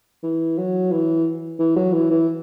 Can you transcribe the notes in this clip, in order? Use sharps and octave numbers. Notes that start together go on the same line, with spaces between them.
E3
F#3
E3
E3
F#3
E3
E3